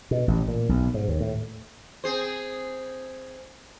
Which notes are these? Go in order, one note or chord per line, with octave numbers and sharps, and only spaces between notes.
B2
A1
A#2
B1
G#2
D#2
A2
C4 G#4 C5